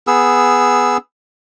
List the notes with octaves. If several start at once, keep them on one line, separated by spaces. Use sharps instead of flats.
B3 G#4 E6